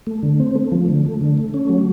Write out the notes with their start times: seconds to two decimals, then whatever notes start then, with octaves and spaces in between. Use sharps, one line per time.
0.07 A3
0.23 D3
0.40 C4
0.55 A3
0.72 F3
0.88 D3
1.05 A3
1.21 D3
1.38 A3
1.54 C#4
1.69 F#3